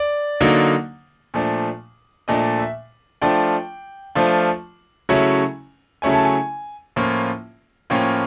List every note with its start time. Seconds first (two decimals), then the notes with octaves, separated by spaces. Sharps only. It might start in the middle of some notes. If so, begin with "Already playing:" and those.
Already playing: D5
0.41 D3 F#3 A#3 D#4
1.34 A#2 F3 A3 D4
2.28 A#2 F3 A3 D4 D#5
2.59 E5
3.22 F3 A3 D4 F4 G5
4.15 F3 A3 D4 F4
5.09 C#3 F#3 A3 C#4 E4
6.02 C#3 F#3 A3 C#4 E4 G#5
6.14 A5
6.25 G#5
6.96 A2 F3 A#3 C#4 F4
7.90 A2 F3 A#3 C#4 F4 G5